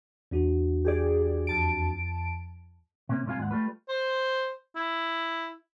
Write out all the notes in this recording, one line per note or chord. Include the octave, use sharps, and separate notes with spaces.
E2 D4 F#4
G4 G#4 D5
F2 A5 D7
C3 A#3 C#4
C2 G2 C3 F4 F5 G#5
D#2 G#2 D4 F#5
G3 A3 F4 B4
C5
E4